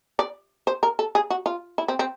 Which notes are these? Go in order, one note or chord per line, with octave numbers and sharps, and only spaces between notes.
D5
C5
A#4
A4
G#4
F#4
F4
E4
C4
C4